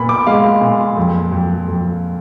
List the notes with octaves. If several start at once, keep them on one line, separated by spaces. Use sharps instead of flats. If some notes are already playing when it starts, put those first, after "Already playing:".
Already playing: A#2 B3 B5
D6
G#3 F5
A#2
F2
F2
F2